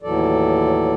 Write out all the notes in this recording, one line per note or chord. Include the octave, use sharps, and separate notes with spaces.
D#2 A2 E3 F#3 A4 D5